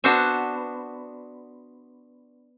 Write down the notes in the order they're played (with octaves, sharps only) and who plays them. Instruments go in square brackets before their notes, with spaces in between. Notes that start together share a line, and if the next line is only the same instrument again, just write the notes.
[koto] B3 D4 F#4 C5 E5